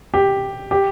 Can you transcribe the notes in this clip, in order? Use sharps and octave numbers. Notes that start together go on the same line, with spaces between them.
G4
G4